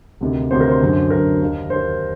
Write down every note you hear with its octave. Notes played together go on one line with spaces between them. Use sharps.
D2 C3 D#3
D2 C3 D#3 C5
A#4
C5
F#2 D3
F#2 D3 A#4
D#2 D#3
D#2 D#3 C5